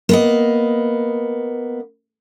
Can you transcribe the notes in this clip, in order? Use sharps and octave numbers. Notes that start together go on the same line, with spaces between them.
A#3 B3 D#5